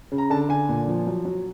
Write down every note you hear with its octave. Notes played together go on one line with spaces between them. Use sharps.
C#3
A#5
D3 A5
D3 G#5
A#2
F3
F#3
F#3